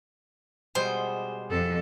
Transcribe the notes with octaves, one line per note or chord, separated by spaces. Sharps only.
B2 G3 G#3 C5
F2 A4